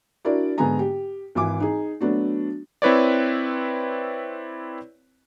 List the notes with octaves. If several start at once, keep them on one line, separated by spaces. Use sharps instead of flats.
D4 E4 F#4 A#4 D5
G#2 D3 B3 G#4 G#5 A#5
G4
G#1 E3 E4 G#5 D6
D#4 G#4
F#3 A3 B3 D4 F#4
C4 E4 B4 C#5 D5